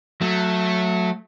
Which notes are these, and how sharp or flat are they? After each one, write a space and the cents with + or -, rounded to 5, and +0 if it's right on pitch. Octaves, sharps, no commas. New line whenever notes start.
F#3 -15 A3 +0